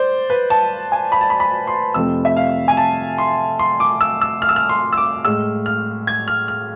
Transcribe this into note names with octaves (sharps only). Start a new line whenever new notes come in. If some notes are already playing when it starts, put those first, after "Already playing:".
Already playing: C5 D5
B4
A5
G#5
B5
A5
B5
B5
C6
F2 C3 F3 A3 E6
E5
F5
G#5
A5
C6
C6
D6
E6
E6
F6
E6
F6
C6
E6
D6
A2 G#3 E6
F6
G#6
F6
F6